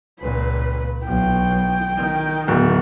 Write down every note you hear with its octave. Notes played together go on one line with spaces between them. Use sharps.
C#2 A#2 B4
B1 G5
D#3
D1 B3